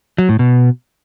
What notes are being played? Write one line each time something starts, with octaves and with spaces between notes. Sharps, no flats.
F#3
A2
B2